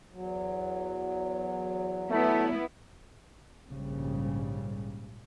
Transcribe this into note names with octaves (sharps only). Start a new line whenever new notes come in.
E2 F#3
A3 B3 E4
A#1 G#2 C#3 G3